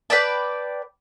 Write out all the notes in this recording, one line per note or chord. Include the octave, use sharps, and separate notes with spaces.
B4 D5 G5 A5